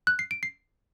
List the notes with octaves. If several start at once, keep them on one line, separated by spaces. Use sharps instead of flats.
F#6
C7
D7
C7